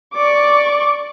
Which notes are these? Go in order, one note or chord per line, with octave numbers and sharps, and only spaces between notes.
D5 C#6 D6